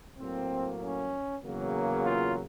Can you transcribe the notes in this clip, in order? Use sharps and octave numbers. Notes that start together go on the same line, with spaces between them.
A2 F#3 A#3 C4
C#4
E2 C#3 F#3 A#3
F4